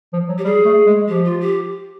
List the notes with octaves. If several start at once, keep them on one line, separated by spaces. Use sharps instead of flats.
F3
F#3
G4
G3 G#4
A3
G#3
F3 G4
F4
G4